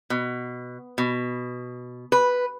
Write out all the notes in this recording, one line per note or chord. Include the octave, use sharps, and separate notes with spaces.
B2
B2
B4